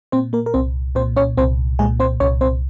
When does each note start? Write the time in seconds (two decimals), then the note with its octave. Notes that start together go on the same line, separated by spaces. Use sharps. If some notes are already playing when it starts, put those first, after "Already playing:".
0.12 A#2 C4 C5
0.33 A#3 A#4
0.46 A#4
0.54 C2 C4 C5
0.95 A#2 C4 C5
1.16 C#4 C#5
1.37 C2 C4 C5
1.79 A#2 G#3 G#4
2.00 C4 C5
2.20 C2 C#4 C#5
2.41 C4 C5